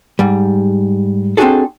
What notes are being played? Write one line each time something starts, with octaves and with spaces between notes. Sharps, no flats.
G#2 G3
C4 D4 F4 F#4 G#4 A4